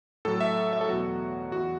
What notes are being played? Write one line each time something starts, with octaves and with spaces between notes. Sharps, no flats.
A2 F#3 A4
E5
E5
A4
E2 B2 F#3 F#4
E2 E3 F#4